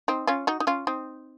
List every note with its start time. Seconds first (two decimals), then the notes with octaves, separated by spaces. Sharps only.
0.08 C4 D#4
0.27 C#4 F4
0.47 D#4 F#4
0.60 D#4
0.67 C#4 F4
0.87 C4 D#4